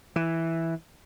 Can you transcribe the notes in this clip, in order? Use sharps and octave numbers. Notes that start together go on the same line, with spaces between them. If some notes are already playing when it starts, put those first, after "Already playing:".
E3